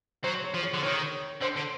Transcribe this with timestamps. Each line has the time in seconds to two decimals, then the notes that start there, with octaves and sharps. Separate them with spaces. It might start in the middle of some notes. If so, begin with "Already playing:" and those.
0.24 F#3 C5
0.44 C#5
0.54 F3
0.63 C#5
0.74 D3
0.83 D#3 C#5
1.42 D3 C5
1.57 D3